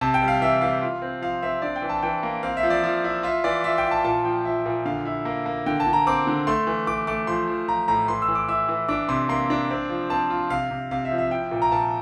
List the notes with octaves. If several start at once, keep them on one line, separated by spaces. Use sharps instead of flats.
C3 A5
G5
G3
F5
E3 E5
E3 F5
F4
C4
F3 F5
C4 E5
D4 D5
G5
E3
A5
E3 G5
A#3
C4 F5
E5
F3
D5
F3
E4
F4 E5
E3 D5
F4 E5
G5
F4
A5
A#2 A5
F3 G5
F3 E5
A#2
D3 F5
E4
A#3
A#3
D3 G5
A5
D3
A#5
C4 D6
D3
A3 C6
E3
E3 D6
A3 D6
F3 C6
F3
F3 A#5
A2 A#5
E3 C6
E6
E3
D6
E4 E6
E3
D4 D6
C3 C6
A#3 C6
D4
C4
F3
C4 A5
F4
C3 F5
C3
C3 F5
E5
F3
E5
E4 G5
A#2
A#5
A#2 A5